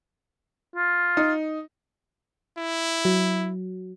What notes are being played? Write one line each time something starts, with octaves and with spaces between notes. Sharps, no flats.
F4
D#4
E4
F#3